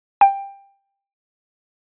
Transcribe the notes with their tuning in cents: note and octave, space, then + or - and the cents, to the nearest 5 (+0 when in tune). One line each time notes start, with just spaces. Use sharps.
G5 +15